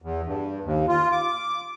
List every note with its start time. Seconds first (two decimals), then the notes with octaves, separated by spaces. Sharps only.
0.02 E2
0.26 G2
0.64 D#2
0.88 F4
1.12 D6